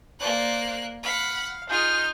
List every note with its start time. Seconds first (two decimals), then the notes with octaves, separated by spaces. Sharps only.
0.20 A#3 C5 D5 F#6
1.03 F5 F#5 B5
1.69 D#4 F4 G#4 F6 G6